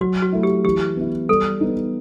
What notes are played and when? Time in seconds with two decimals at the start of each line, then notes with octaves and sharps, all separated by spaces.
0.01 F#3 F#4
0.22 F#4
0.32 A3 E4
0.43 G4
0.65 E3 G4
0.97 B3 E4
1.29 G3 A4
1.61 B3 D#4